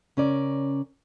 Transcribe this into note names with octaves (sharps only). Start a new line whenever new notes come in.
C#3 C#4 A#4 D5